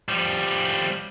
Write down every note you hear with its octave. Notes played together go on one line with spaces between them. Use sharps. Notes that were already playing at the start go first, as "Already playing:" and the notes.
F3 G3